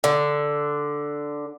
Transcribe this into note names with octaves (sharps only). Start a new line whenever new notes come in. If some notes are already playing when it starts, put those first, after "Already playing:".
D3